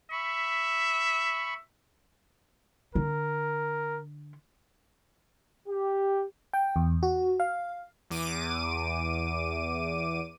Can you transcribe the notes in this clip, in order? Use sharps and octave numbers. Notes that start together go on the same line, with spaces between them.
E5 B5 C#6
D3 A#4
G4
G5
E2
F#4
F5
E2 D6 D#7